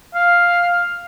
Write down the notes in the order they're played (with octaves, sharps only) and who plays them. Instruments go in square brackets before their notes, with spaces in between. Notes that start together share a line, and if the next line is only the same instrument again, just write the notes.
[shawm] F5